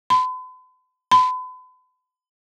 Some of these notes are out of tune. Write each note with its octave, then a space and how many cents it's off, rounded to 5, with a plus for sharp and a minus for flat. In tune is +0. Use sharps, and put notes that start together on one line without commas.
B5 +45
B5 +40